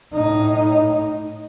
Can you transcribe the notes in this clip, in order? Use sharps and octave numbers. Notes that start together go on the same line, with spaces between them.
A2 D#4